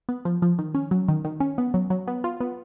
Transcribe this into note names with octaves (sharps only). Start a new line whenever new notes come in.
B3
F3
F3
D#3
C#4
F#3
D#3
D#3
C#4
B3
F#3
F#3
B3
F4
B3